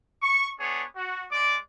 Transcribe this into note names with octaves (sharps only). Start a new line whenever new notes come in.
C#6
B3 D4 G#4 C#5
F#4
G#3 D5 D6